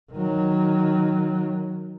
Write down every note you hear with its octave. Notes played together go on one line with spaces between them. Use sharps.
D#3 F#3